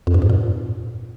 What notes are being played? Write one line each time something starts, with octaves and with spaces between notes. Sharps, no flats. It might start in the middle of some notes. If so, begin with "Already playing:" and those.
F2
G2
G#2
A#2